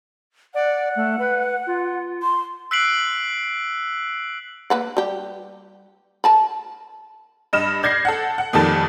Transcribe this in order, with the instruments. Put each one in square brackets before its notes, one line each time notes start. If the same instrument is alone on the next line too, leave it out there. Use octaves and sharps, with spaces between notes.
[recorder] D5 [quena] F#5
[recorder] A3
B4
F4
[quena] C6
[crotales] E6 F#6 B6 C7 D7 F#7
[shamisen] A#3 B4 F#5
G3 G4
A#4 A5 B5
[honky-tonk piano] G2 D#5 F6 E7
D5 G6 G#6 A#6 C7
A4 F#5
F#5
F2 A#2 D#3 G3 A4 A5